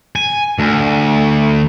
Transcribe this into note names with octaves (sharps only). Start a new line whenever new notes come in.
G#5
D2